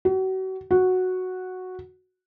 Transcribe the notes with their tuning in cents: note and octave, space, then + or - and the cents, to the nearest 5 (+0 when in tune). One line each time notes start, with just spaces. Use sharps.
F#4 +35
F#4 -5